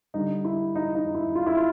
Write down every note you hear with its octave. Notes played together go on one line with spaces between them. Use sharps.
D3 G3 D#4
E4
D#4
D#4
E4
F4
E4
F4